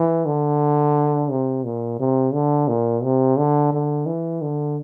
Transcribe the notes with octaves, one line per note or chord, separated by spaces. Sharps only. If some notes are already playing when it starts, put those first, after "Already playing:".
Already playing: E3
D3
C3
A#2
C3
D3
A#2
C3
D3
D3
E3
D3